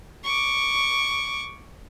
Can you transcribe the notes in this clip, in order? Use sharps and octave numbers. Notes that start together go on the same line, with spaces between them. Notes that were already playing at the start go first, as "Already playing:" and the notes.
C#6 D6